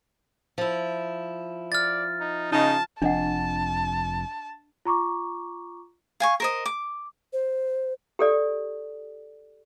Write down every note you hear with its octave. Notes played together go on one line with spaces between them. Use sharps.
F3 E4
D5 F6 A6
D#4
C#3 D#4 A5
F1 F2 D4 D#5 F#5 A5
F4 A#5 C#6 D6
F5 G#5 C#6
A#4 C5 D#5
D6
C5
G4 A4 D5